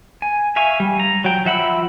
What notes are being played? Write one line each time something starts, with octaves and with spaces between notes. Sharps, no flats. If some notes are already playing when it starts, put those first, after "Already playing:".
G#5
E5 F5 G#5 C#6
G3
A#5
F#3 G5
F3 E5 F#5 B5 E6